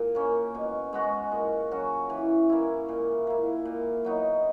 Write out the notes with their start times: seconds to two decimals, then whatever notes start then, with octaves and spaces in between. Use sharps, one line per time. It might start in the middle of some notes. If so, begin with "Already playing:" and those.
Already playing: A#2
0.15 A#3 C#4
0.55 B2
0.93 G#3 B3 F#4
1.32 A#2
1.71 F#3 C#4 F#4
2.10 E3
2.49 A#3 E4
2.89 A#2
3.27 A#3 E4
3.65 A#2
4.05 F#3 B3 D#4